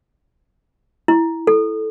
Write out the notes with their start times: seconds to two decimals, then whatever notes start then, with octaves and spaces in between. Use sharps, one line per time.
1.08 E4
1.47 A4